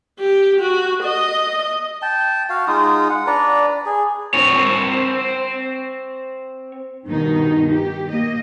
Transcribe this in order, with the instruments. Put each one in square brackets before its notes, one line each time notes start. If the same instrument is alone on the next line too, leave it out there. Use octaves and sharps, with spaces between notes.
[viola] G4
F#4
D#5
[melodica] G5 A5
F#4 F5
G#3 D#4 F4 D#6
F#5
D4 B4 D5 A#5
G#4
[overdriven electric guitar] C4 C#5
[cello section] G2 B2 D#3 D#4
G4
A#3 D#5